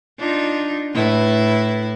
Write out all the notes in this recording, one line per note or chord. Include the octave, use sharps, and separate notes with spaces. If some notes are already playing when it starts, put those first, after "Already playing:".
D4 D#4 F4
A2 E4 B4